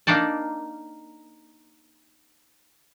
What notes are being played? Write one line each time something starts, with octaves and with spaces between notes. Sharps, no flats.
A#3 D4 D#4 D5 A5